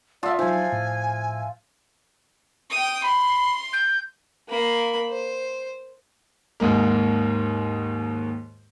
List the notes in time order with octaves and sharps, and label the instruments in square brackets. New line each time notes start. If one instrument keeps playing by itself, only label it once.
[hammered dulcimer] F4 E5 [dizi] D5 [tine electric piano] F#5 A5 D#6
[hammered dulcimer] F3 [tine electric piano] F#3 D#4 [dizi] G#5
[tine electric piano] A2
[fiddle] G5 D#6
[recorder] B5 [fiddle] C6
[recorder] G6
[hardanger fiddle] A#3 B5
C5
[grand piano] D#2 G#2 G#3 A#3